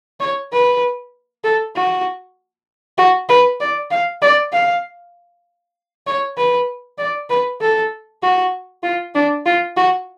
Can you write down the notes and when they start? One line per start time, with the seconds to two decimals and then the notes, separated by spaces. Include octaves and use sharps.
0.20 C#5
0.52 B4
1.44 A4
1.75 F#4
2.98 F#4
3.29 B4
3.60 D5
3.91 F5
4.22 D5
4.52 F5
6.07 C#5
6.37 B4
6.98 D5
7.30 B4
7.61 A4
8.23 F#4
8.83 F4
9.15 D4
9.46 F4
9.77 F#4